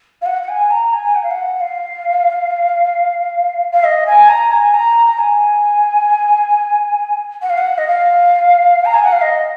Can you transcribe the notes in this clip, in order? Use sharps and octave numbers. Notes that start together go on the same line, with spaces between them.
F5
F#5
F#5
G#5
A#5
G#5
F#5
F5
F#5
F5
F5
D#5
G#5
A#5
G#5
A#5
A#5
G#5
F#5
F5
F#5
D#5
F5
A#5
G#5
F#5
F5
D#5